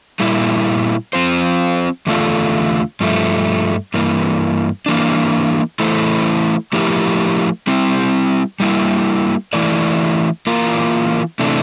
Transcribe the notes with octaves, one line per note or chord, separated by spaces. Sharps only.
A#2 G3 A#3 E4
F3 C4 F4 C5
E2 D3 A3 D4 F4
G2 F3 A3
G2 E3 A#3
E3 A#3 D4
E3 A3 E4 A4 C5
F3 A3 E4 G4 A#4
G3 C4 E4
G3 A#3 E4
E3 A3 E4 A#4 D5
E3 A#3 F4 A#4
C3 E3 A3 D4